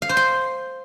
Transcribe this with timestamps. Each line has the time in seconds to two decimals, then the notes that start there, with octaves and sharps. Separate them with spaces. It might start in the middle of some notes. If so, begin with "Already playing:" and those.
0.02 F5
0.09 C5
0.17 C6